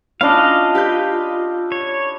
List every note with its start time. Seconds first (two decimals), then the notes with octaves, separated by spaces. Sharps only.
0.21 C#4 D4 E4 F4 D#5 F5
0.75 G4 B4 G6
1.72 C#5